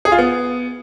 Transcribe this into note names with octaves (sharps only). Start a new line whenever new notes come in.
G#4
F4
B3